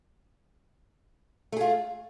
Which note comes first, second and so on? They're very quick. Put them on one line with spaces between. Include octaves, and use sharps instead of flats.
A3 G#4 F4